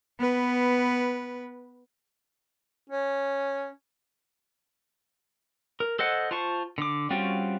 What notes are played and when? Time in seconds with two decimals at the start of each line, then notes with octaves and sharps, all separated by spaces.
0.19 B3 B4
2.90 C#4
5.80 A#4
5.99 A4 C5 D#5 F#5
6.31 F4 C5 A5 C#6
6.78 D3 D6
7.10 G3 C4 C#4 F4 F#4